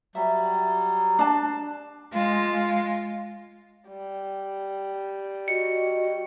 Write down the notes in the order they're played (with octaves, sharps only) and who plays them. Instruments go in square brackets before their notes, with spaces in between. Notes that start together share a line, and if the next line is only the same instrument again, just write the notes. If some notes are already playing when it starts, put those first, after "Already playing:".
[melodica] F#3 G3 [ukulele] E5
[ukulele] D4 A5
[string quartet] G#3 F4
[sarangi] G3
[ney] F#4 [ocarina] D#5 [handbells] C#7